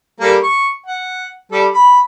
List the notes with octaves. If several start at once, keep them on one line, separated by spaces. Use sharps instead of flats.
G3 A#3 A4
C#6
F#5
G3 A4
B5